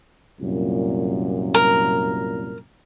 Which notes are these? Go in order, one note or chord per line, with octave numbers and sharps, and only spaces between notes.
C2 F#2 A#2
A#4